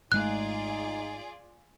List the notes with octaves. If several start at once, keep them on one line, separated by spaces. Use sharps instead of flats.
G#1 G#3 A3 D#4 F4 G#4 D5 F#6